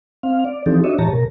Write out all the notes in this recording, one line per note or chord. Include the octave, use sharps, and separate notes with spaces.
C4 F5
D5
E3 F3 C4 D#4 G4 A4
D4 F#4 C#5 D#5 E5
A2 E3 G4 C#5 A5 A#5
B2 A#4